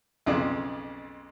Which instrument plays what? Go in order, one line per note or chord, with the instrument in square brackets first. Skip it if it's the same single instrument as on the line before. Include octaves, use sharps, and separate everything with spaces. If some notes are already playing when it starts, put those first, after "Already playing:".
[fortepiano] B1 F2 C#3 D5